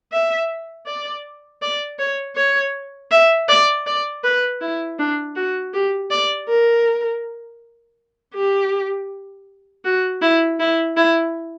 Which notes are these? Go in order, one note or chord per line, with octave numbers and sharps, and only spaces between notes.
E5
D5
D5
C#5
C#5
E5
D5
D5
B4
E4
D4
F#4
G4
D5
A#4
G4
F#4
E4
E4
E4